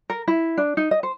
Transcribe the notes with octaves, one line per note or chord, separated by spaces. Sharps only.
A#4
E4
D4
D#4
D#5
C5